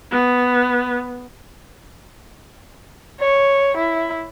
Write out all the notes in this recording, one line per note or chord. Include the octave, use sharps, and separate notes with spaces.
B3
C#5
E4